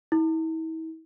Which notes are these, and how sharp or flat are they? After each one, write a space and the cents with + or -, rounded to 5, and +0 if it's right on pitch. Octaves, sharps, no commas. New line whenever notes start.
E4 -40